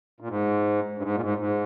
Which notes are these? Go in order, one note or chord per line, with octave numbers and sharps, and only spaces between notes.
A#2
G#2
G2
G#2
A#2
G#2
G#2